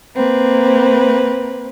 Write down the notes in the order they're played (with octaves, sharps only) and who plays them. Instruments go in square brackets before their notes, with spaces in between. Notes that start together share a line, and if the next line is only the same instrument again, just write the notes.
[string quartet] A#3 C4 B4